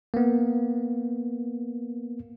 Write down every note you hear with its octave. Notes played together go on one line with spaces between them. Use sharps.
A#3 B3